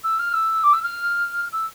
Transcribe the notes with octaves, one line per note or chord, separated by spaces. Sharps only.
E6
F6
E6
D6
E6
F6
E6